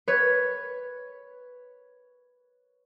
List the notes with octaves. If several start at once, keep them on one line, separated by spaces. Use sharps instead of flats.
B4 C#5